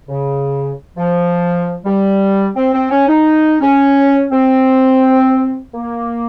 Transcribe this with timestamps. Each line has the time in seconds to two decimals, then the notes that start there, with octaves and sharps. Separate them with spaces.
0.09 C#3
0.97 F3
1.85 G3
2.55 C4
2.74 C4
2.91 C#4
3.08 D#4
3.61 C#4
4.31 C4
5.73 A#3